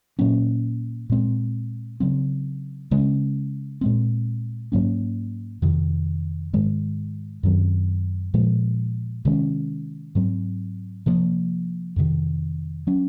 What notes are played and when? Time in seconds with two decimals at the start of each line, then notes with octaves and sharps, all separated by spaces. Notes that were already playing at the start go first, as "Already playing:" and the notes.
0.19 A#2 F#3 A#3 C#4
1.10 A#2 G#3 C4
2.00 C#3 F#3 C4
2.91 C#3 G#3 C#4
3.81 A#2 G#3 C4
4.72 G#2 F#3 A#3 C#4
5.62 F2 C3 D#3
6.53 G#2 D#3 G#3
7.43 F#2 D#3 F#3 C4
8.34 A#2 F3 G#3
9.25 C3 D#3 G#3 C#4
10.15 G#2 F#3 C4
11.06 C3 F3 A#3
11.96 F2 C3 D#3
12.87 F#3 C#4